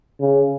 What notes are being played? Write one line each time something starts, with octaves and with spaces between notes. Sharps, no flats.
C#3